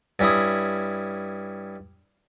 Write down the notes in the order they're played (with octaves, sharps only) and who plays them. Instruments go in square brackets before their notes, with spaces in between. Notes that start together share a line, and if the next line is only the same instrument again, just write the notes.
[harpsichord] G2 C#4 E4 D#6